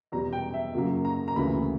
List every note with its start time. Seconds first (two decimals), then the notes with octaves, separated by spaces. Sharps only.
0.12 E2 B2 G3 A#5
0.33 G5
0.54 E5
0.74 F#2 C#3 F#3 A#3
1.05 A#5
1.28 A#5
1.36 D2 C#3 E3 A#3 B5